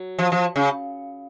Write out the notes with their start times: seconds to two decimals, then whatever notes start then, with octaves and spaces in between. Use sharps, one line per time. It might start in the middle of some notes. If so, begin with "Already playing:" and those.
Already playing: F#3
0.19 F3
0.32 F3
0.56 C#3